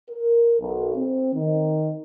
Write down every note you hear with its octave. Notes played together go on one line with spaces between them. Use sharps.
A#4
B1
C4
D#3